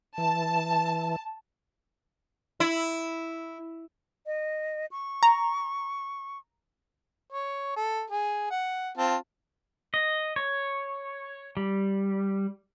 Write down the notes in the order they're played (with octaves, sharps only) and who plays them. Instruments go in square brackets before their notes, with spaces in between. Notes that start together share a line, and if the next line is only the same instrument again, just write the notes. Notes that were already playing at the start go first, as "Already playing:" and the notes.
[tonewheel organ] E3 [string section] A5
[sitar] E4
[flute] D#5
C#6
[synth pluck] A#5
[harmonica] C#5
A4
G#4
F#5
C4 F4 A5
[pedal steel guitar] D#5
C#5
G3